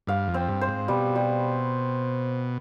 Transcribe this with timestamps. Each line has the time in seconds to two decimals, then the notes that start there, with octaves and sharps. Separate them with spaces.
0.07 G2 F5
0.28 F2
0.34 C4
0.48 G2
0.61 C5
0.68 G#2
0.88 B2 G3
1.15 G3